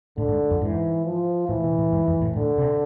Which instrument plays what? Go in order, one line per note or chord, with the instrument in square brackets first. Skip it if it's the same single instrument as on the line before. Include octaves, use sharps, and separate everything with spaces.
[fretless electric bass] A2 [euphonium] D3
[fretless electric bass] G#2
F2
[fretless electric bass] G#2 [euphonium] E3
[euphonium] F3
[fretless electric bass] A2 [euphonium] E3
[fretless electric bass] B2
A2
G#2
F2
A2
[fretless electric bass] A2 [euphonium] D3
[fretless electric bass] C3